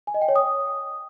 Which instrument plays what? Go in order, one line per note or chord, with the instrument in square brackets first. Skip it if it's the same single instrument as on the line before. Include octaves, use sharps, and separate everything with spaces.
[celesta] G#5
D#5
G5
C#5
D#6